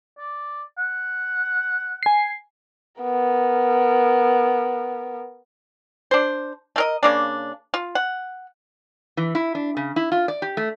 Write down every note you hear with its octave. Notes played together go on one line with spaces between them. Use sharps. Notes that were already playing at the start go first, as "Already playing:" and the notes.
D5
F#5
G#5 C7
B3 A#4
D4 C5
A3 A#4 D#5
C#3 A#3 D4
F4
F#5
E3
E4
D4
C#3
E4
F4
D5
G4
A3